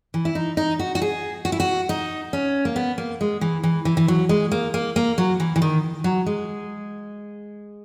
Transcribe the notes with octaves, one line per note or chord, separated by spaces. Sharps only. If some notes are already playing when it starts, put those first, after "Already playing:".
E3
E4
D#4
D#4
F#4
F#4
G#4
F#4
E4
F#4
D#4
C#4
A#3
B3
A#3
G#3
E3
E3
E3
E3
F#3
G#3
A#3
A#3
A#3
F#3
E3
E3
D#3
F#3
G#3